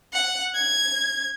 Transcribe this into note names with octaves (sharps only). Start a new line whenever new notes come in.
F#5
G#6